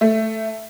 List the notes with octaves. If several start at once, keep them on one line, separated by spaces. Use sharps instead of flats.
A3